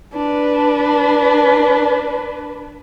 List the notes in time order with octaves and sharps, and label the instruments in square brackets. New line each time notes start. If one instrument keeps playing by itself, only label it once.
[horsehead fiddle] D4 B4